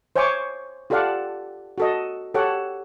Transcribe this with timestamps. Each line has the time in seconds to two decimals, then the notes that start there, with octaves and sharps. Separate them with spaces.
0.16 C5 C#5 E5 G#5 C#6 D6
0.90 F4 G4 A4 D5 F5 F#5
1.78 F#4 A4 D#5
2.34 G4 A4 C#5 F#5